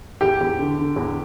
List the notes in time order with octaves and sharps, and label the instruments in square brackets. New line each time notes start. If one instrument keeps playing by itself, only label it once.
[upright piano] E2 G4
E2
D3
D3
E2